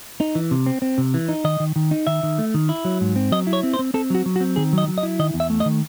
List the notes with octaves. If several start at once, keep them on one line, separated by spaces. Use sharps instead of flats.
D#4
E3
C3
C4
C4
C3
E3
D#4
D#3 D#5
D#3
D#3
D#4
D#3 E5
D#3
A3
D#3
E4
F#3
G#2
C4
F#3 D#5
E4
C#5
C4
C5
C4
C4 A4
F#3 F#4
F#3
F#4
C4
D#3 G#4
F#3 D#5
F#3
D#5
E4
D#3 D#5
E2
E5
A3
D#5
D#3